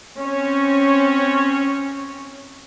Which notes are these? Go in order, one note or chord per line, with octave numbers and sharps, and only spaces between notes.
C4 C#4 C#5